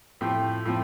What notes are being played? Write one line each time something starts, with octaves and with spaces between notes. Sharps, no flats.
A2 F3 C4 G4
A2 F3 C4